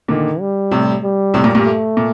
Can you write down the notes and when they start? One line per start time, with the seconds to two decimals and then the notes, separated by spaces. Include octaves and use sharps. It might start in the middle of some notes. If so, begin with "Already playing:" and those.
0.08 A#2 D3 D#3
0.40 G3
0.71 A2 C3
1.03 G3
1.34 A2 C3
1.44 G2 A#2
1.55 G2 A#2
1.65 A3
1.97 A#2